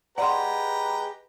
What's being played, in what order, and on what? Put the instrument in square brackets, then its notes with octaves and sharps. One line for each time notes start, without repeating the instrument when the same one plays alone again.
[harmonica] G4 A#5 [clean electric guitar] G#4 D#5 F#5 [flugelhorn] B4 [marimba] D5 C6